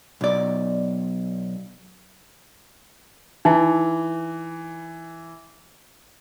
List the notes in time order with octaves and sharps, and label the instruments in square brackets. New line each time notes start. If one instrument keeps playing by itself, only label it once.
[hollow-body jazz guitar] B1 D5
[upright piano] E3 [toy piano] D#4 E4